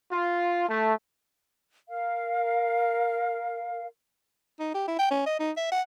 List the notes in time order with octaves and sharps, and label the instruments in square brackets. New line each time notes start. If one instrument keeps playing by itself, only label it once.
[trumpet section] F4
A3
[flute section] A#4 F5
[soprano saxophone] D#4
G4
E4
G5
C#4
D#5
D#4
E5
F#5